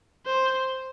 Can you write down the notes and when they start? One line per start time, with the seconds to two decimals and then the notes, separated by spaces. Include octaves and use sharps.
0.26 C5